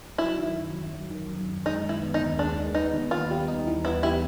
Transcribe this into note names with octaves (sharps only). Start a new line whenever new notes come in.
F#3 E4
D#3
F#2
F#2
F#3
D#3
F#2
F#2
G#3 D#4
D#3
E4
B3
D#4
D#2
G#3 D4
D#3
B3 D#4
D#2
B3 F4
G3
D#4
E3
B3 E4
G3 E4